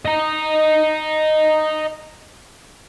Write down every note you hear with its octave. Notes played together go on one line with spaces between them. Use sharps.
D#5 A#5